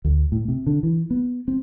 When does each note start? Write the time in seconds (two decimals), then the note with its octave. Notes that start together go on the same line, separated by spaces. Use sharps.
0.05 D2
0.32 A2
0.48 C3
0.67 D3
0.83 E3
1.10 B3
1.48 C4